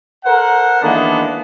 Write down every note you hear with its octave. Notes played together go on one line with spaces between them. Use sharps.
A4 A#4 C5 F#5
D#3 E3 G#3 A#3 B3 D4